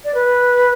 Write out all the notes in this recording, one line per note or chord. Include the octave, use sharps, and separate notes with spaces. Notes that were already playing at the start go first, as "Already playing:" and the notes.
D5
B4